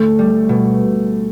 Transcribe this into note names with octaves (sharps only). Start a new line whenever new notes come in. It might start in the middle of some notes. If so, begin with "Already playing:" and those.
Already playing: D2 D3 A3
G3
B2